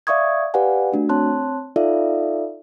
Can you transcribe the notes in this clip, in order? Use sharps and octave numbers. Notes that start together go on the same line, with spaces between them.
D5 E5 F5 C#6 D#6 G#6
G4 B4 D5 F5 F#5 G#5
A3 D4 F#4
C4 C#5 A5 C6 F#6
D#4 F4 A4 D5 E5 F5